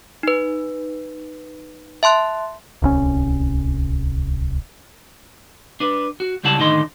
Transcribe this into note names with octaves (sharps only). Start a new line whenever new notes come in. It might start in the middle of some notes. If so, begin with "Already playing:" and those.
D#4 B4
E5 A5 C6 F#6
D1 C2 C#4
D4 B4
F#4
C#2 C#3 G3 E4 F#5 A5
A2 D3 D#3 D#4 D#5 C6